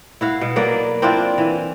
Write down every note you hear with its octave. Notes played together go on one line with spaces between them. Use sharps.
E4 F#4 F5
B2
F#3 A#3 B3 D5
C4 D4 E4 F4
E3